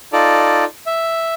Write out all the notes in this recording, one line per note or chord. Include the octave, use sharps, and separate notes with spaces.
D#4 F4 A4 D5
E5